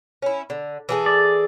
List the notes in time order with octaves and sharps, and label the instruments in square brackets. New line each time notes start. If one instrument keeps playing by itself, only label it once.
[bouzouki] C#4 E4
D3
E3 G#4 A4
[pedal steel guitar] D5